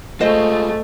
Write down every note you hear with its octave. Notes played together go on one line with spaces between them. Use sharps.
G#3 A3 F4 C5 D#5